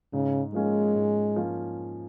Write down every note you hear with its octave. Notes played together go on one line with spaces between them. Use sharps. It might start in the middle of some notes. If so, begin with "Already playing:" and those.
G#2 C#3
F3 G#3 A#3 C#4
G#2
F3 A#3 C#4